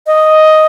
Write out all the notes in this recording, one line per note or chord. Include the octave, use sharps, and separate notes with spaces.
D#5